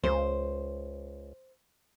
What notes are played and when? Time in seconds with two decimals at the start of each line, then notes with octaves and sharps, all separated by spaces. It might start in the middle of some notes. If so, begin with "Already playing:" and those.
0.04 C#2 C5